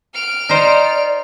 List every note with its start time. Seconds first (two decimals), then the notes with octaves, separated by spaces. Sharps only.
0.14 F6 D7
0.49 D#4 C5 D5